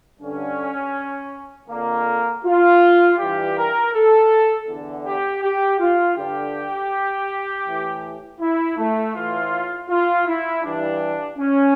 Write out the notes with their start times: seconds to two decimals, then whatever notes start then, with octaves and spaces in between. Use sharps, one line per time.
0.19 G2 D3 C#4
1.68 F2 D3 A#3
2.44 F4
3.18 G2 E3 G4
3.55 A#4
3.92 A4
4.66 E2 D3
5.04 G4
5.42 G4
5.79 F4
6.17 G2 D3 G4
7.66 A2 E3
8.40 E4
8.77 A3
9.14 A2 E3 F4
9.89 F4
10.26 E4
10.63 G2 E3 D4
11.38 C#4